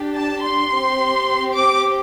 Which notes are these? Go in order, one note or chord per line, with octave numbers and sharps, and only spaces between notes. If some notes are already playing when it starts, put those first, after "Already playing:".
Already playing: D4 G4
A5
C6
C4 G4
D6